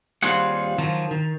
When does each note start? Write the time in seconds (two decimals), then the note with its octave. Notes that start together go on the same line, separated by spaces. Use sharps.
0.23 D#2 G3 C4 F4 G#4 F#5
0.78 D#3 F3 F#3
1.11 D#3